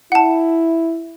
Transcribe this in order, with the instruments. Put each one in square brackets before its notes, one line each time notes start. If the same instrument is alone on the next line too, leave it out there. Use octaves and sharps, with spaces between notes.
[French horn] E4 [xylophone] F#5 A5